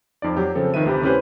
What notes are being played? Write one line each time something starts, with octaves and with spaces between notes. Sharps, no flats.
F2 D#4 D5
F#3 G4
C#3 F3 C4 A4
D#3 F3 B4 E5 D#7
D2 C3 G4 B5
C#4 E4 G4 B4 C5